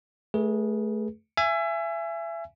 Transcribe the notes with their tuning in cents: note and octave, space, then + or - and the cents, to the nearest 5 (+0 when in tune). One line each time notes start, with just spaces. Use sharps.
A3 -15 G#4 +0 B4 -35
E5 +30 G#5 +0